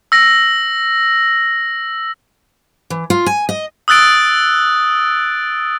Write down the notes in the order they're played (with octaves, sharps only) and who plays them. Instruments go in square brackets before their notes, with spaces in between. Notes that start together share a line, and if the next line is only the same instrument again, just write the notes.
[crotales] E6 A#6
[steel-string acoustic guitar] E3
F4
G#5
D#5
[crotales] D#6 E6 F#6 A6 D7